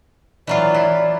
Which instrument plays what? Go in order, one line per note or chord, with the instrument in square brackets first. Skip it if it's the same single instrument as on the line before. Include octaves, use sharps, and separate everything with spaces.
[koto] E3 F#3 F4 [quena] D5
[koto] E4